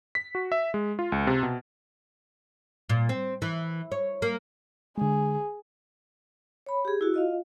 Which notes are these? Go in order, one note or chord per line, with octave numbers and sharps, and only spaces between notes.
B6
F#4
E5
G#3
F4
C#2
C3
B2
A#2
C4
E3
C#5
A#3
D3 G#3 G#4
C#5 B5
G4 G#4
E4 F#4
F4 D#5 F5